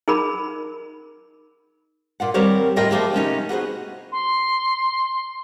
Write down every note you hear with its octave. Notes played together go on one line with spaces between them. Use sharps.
D#4 G#4 A#4 B5
A#2 F4 F#5
D#3 G3 C4 A#4 C5 C#5
D#2 A2 F4 A#4 D#5 G5
F3 A3 A#3 G4 G#4 C#5
C3 A3 C#4 D#4
B3 F#4 G#4 C5
C6